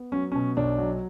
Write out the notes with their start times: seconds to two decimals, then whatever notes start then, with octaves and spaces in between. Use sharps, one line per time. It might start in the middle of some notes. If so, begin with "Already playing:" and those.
Already playing: B3
0.12 F#3 C#4
0.32 B2 C#4
0.57 B1 D4
0.78 F#3